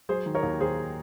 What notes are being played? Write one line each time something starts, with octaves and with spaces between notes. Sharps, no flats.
F#3 G#4 C5
D#3
A#4 C#5
D#2
D#3 G#4 C5